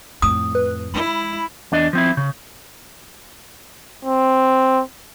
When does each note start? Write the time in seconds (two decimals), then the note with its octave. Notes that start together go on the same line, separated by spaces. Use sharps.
0.22 F2 A2 D#6
0.55 B4
0.94 G#3 E4 B5
1.72 E2 D4 D#5
1.93 F3 C4 E4
2.17 C#3
4.05 C4